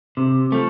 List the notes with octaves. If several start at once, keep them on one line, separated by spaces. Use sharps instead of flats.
C3
F3 A3